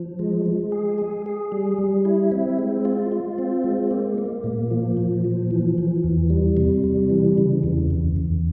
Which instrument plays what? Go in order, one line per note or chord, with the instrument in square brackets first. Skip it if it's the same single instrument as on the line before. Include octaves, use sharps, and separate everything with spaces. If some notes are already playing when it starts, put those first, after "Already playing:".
Already playing: [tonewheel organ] F3
G#3
G#3
G#4
G#4
G#4
G3
G3
E4
C4
G#3
F4
F4
C4
G#3
A#3
A#3
A#2
F3
A#2
F3
E3
E3
E2
G3
C3
G3
E3
C#3
E2
E2
E2